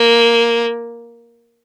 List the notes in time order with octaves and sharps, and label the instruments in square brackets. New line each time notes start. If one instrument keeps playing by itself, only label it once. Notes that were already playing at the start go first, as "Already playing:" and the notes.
Already playing: [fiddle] A#3